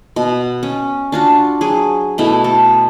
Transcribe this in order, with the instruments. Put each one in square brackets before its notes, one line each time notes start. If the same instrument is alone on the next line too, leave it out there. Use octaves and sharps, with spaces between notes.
[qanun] B2
C#4
D4 F4 F#4
F#3 G#4
B2 A3 E4
A4